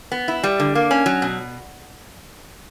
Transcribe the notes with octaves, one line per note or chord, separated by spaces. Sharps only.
B3
E4
G3
D3
A#3
C#4
F#3
B2